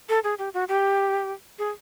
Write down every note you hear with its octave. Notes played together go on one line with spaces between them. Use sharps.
A4
G#4
G4
F#4
G4
G#4